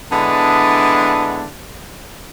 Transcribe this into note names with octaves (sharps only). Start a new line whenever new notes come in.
D3 G#3 B3 D4 E4